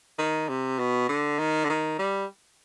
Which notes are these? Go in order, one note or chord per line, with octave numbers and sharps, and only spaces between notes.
D#3
C3
B2
D3
D#3
D3
D#3
G3